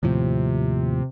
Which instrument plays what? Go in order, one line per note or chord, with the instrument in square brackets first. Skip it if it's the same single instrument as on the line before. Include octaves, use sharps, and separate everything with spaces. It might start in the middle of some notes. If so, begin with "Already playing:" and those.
[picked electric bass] D#2 A2 F3 [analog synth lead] C3